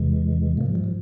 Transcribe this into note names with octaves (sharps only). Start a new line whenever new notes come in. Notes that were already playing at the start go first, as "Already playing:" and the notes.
Already playing: E2 C3 E3 G#3
G#2 F3 A#3
G#3
G3
F3